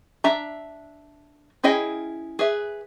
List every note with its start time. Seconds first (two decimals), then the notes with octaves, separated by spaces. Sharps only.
0.24 D4 E5 A#5
1.64 C#4 E4 G#4 D#5 G5
2.39 G#4 B4 E5